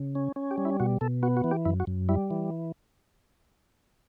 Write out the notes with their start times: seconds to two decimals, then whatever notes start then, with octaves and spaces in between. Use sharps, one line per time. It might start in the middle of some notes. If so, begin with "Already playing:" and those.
Already playing: C#3
0.15 C#4
0.36 C#4
0.51 G4
0.58 G3
0.65 E4
0.80 B2 F#4
1.01 B2 A4
1.23 B3 F#4
1.37 F#4
1.44 E3
1.51 G4
1.65 F#2 E4
1.80 F#4
1.87 F#2
2.09 G3 E4
2.31 E3